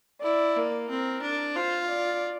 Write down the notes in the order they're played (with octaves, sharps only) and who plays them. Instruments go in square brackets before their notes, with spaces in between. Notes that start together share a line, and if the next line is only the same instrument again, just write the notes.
[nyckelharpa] E4 [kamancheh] D5
[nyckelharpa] A#3
[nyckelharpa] C4 [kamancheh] A#4
[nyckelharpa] D4
[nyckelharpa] F4 [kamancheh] C5
[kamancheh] D5